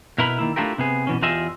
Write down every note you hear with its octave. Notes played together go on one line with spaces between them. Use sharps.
B2 E4 A#4 B4 B5
D#3 A#3 E4
A3 D4 E4 F4 G4 A#4
C3 B3 G#4
B2 E3 C#4
E2 F4 G4 G#4 D#5 E5